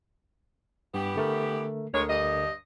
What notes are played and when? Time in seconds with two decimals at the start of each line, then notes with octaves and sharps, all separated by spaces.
0.94 G2 E3 B3 G4
1.16 D3 A3 A#4
1.93 D2 D3 G#3 A#4 C#5
2.08 G2 D#5